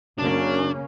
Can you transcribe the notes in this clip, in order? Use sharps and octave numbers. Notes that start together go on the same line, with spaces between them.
F#2 C#3 A#3 C#4 D4